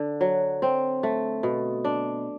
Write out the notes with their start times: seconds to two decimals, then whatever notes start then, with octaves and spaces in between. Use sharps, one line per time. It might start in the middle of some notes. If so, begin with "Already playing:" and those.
Already playing: D3
0.21 F#3
0.62 C4
1.03 A3
1.43 B2
1.85 D4